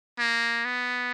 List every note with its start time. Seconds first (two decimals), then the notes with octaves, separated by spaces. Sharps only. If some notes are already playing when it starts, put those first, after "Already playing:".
0.19 A#3
0.65 B3